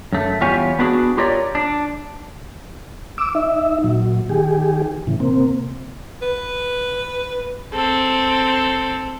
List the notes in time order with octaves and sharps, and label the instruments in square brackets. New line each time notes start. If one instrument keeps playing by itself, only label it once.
[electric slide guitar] F#2 A3
E2 G3 F4 G4 C#5 G#5
B3 D4 F#4 G#4
F4 G4 A#4 C#5 D5
D4
[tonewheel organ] D6 E6
D#4 E5
A#2 F#3
D#3 G4 G#4
A2 C#3 E3
C3 A#3 C4
[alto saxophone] B4
[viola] C4 A4